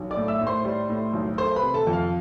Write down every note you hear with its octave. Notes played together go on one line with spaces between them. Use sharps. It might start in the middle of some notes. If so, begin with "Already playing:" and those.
Already playing: B1
D5 D6
A2
E5 E6
A2
C5 C6
G3
A2
B1
A3 C5 C6
B4 B5
C3
A4 A5
F2
F5